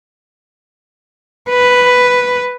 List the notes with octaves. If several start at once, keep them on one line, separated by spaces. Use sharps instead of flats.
B4